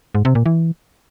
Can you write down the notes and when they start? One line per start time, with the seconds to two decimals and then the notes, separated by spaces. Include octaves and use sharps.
0.15 G#2
0.25 C3
0.35 A#2
0.46 E3